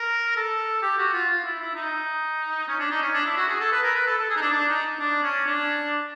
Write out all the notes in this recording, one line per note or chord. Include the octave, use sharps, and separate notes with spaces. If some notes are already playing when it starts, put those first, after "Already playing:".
Already playing: A#4
A4
G4
F#4
F4
F4
E4
E4
D#4
C#4
D4
D#4
C#4
D4
E4
F#4
G#4
A4
B4
A#4
B4
A4
A4
G#4
D#4
D4
D4
D#4
D4
C#4
D4